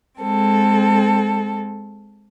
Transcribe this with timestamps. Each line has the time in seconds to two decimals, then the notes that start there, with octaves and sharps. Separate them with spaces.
0.21 G#3 C4 A4